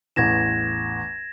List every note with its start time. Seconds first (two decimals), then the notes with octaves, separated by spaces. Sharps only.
0.16 A1 E2 G#6 A#6 E7